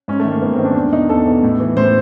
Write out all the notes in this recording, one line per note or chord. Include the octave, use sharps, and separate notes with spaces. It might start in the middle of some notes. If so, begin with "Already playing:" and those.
G#2 C#4
A3
D#3
A#3
G#2 B3
C4
D#3
D4
E2 D4
B2 D#4
E2 A4
B2
A2
E3
A2 C5